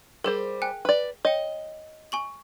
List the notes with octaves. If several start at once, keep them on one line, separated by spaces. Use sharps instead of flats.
G3 G#4 A#4 C5
G5 G#5 F#6
B4 D5
C#5 D#5 G5
G#5 C#6 F#7